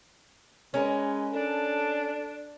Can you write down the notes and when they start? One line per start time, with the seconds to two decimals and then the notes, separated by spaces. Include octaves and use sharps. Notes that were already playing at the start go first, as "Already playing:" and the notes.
0.74 G#3 C#4 A#4 B4
1.33 D4 A4